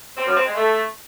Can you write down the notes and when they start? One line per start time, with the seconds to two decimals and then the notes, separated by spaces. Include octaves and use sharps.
0.16 C4
0.26 F#2
0.36 C4
0.45 G#3
0.55 A3